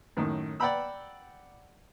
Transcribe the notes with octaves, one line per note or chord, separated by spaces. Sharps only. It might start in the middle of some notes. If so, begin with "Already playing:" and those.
F#2 A2 D#3
D5 F#5 G5 A#5 B5 E6